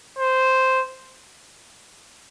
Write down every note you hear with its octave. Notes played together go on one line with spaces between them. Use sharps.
C5